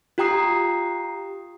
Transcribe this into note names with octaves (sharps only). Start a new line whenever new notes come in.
F4 G4 G5 A#5 D#6 C7